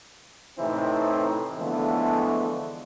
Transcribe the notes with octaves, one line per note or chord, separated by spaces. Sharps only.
A2 C3 E3 C4 D#4 E4
D3 E3 F3 G#3 A3 B3